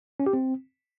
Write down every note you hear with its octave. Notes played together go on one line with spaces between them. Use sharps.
C#4
G4
C4